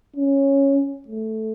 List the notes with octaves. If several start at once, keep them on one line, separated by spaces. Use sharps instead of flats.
C#4
A3